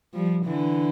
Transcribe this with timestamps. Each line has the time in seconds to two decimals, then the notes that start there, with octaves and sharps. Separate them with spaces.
0.14 F3 G3
0.44 D3 E3